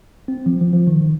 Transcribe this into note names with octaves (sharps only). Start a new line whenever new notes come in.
C4
F3
F3
F3
D#3
D#3